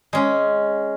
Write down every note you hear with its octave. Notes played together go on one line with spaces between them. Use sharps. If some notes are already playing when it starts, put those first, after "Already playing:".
G#3 C#4